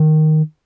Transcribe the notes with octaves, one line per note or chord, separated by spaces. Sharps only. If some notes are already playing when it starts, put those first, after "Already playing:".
Already playing: D#3